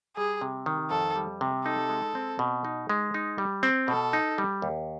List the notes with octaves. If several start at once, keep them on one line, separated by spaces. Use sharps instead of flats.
G3 G#4
C3
D#3
F2 A4
G3
C3
D#4 A4
G#3
C4
B2
D#4
G#3
D#4
G3
C4
B2 A4
D#4
G3
D#2